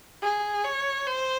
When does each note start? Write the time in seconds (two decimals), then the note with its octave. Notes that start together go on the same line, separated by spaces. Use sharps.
0.22 G#4
0.64 C#5
1.07 C5